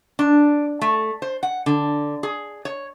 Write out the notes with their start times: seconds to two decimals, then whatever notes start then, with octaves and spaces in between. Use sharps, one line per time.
0.19 D4
0.81 A3
1.22 C5
1.43 F#5
1.66 D3
2.23 G#4
2.65 C#5